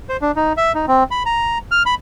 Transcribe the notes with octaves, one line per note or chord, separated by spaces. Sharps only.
C5
D4
D#4
E5
D#4
C4
B5
A#5
F6
B5